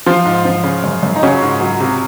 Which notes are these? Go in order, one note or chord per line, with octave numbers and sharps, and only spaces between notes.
F3 F4
G#2
F3
C#3
F#2
F#2
D#4
C#3 F#3 C#4
G#2
F#3
C3